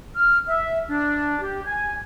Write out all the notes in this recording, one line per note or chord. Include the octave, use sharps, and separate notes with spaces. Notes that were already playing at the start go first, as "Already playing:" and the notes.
F6
E5
D4
G4
G#5